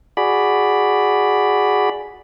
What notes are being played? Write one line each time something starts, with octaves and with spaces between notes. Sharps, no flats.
F#4 G#4 D5 B5